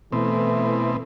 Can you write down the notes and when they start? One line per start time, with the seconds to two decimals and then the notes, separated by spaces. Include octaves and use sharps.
0.12 B2 E3 A3 C4